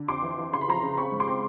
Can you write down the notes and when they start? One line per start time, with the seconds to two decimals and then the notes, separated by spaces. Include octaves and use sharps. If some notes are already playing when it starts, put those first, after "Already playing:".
Already playing: D3
0.08 F2 C6 D6
0.23 E3
0.38 E3
0.53 C#3 C6
0.61 B5
0.68 F3 A#5 C6
0.83 C#3
0.97 C4 B5 C#6
1.12 G#2
1.20 C6 D6
1.27 C4